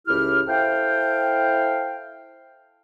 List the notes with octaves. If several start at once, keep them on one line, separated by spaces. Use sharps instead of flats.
C#2 A2 E4 G4 F6
E4 A4 C5 F5 G5